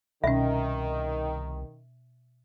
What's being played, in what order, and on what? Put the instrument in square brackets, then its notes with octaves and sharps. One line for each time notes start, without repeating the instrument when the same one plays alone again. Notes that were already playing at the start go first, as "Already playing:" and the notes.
[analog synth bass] C2 [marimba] B2 C#4 [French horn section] D#3 [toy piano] E5